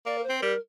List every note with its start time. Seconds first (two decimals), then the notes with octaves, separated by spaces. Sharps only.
0.05 A#3 D5
0.18 A#4
0.23 C5
0.29 C4
0.42 G3 A#4